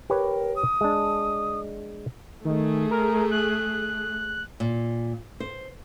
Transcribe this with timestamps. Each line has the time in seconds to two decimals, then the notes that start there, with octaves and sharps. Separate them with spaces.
0.10 G4 A#4 B4 C#5
0.56 D#6
0.81 G#3 D4
2.45 D#3 A3 G#4
2.91 A#4
3.31 F#6
4.60 A#2
5.40 C5